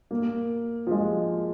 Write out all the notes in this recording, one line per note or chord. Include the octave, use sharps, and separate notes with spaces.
A#3
F3
G#3